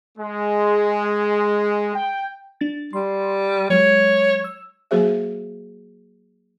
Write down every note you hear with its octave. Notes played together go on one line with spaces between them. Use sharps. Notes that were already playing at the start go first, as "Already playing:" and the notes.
G#3
G5
D4 A6
G3 C6
F#3 G#3 C#5
E6
F#3 A#3 F#4 G#4 C5 E5